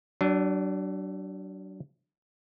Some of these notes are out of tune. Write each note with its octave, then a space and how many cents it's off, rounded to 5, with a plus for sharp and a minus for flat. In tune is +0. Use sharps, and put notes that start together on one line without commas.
F#3 +35 D4 +0